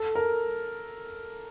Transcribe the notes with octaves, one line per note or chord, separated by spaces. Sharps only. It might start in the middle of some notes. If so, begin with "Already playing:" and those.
Already playing: A4
A#4